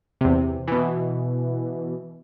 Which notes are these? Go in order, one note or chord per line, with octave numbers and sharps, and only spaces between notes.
E2 C3
B2 E3